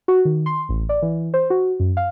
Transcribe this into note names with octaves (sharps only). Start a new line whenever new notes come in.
F#4
D#3
C6
A1
D5
E3
C5
F#4
F#2
F5